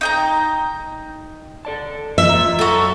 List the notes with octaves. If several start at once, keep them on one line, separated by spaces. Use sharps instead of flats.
D#4 G5 A#5
A4 D5 A5
A#3 D#5 E5
F4 A#5
F#2 F#4 A4 A#5